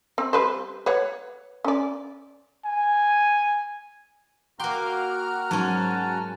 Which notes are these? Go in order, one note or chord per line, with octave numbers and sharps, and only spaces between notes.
C4
G3 B4 C5
B4 C#5 F#5
C#4 D5
G#5
A#3 F#4 G5 A#5 C6 D6 F6
G#2 F#3 C#4 A5